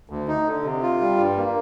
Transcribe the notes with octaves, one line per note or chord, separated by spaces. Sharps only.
D2
D#4
D3
C3
F4
G3
G2
A#3